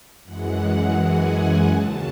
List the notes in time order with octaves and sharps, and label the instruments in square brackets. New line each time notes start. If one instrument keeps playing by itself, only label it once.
[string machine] F#2 E3 G#3 F#5
G#5
D#2 C#3 F#3 A5